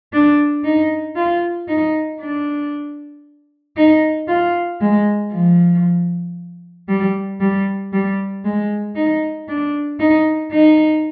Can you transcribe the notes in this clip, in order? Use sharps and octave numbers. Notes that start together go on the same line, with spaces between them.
D4
D#4
F4
D#4
D4
D#4
F4
G#3
F3
G3
G3
G3
G#3
D#4
D4
D#4
D#4